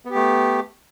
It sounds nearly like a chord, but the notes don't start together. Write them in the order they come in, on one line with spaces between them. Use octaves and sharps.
B3 G4 A3